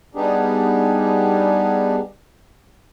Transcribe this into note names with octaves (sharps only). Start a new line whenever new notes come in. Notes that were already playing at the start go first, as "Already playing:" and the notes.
G3 B3 D4 D#4 G4 G#4